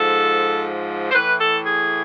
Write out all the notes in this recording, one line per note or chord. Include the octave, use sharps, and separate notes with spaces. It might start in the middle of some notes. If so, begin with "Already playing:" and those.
Already playing: G#2 F3 A4
C5
A2 E3 B4
A4
G#4